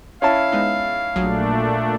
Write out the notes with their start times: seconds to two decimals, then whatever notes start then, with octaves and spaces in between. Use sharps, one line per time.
0.22 C#4 E4 F5 A5
0.52 G#3 B3 D#4
1.16 A#1 A#2 F#3 A3 D4 G#4